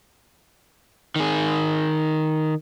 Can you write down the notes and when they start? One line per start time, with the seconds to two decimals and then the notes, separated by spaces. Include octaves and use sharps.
1.16 D#3 G#4